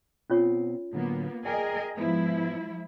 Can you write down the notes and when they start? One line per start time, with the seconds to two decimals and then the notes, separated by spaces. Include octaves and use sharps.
0.30 B2 C4 C#4 F4 C#5
0.93 A2 D3 F#3 A#3 B3
1.45 G#4 A#4 D5 D#5 G5 G#5
1.97 G#2 F3 G#3 B3 E4